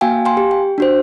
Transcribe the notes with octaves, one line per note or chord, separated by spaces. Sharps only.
A#3 F#4 F5 G5 G#5
F5 G5 G#5 C6
G4
G5
D4 F#4 C5